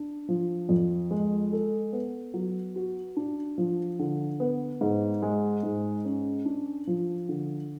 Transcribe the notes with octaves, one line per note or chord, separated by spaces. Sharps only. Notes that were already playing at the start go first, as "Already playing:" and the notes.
Already playing: D4
F3
F2
G#3
A4
B3
F#3
F#4
D4
F3
D3
B3
G#2
G#3
G#2
C#4
D4
F3
D3